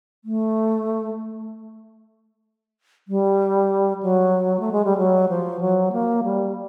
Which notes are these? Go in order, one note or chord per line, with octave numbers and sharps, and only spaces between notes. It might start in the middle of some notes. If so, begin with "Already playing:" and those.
A3
G3
F#3
A3
G#3
G3
F#3
F3
F#3
A#3
G3